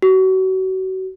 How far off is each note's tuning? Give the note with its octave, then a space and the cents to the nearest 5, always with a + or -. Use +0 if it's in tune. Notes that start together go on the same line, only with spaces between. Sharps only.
F#4 +30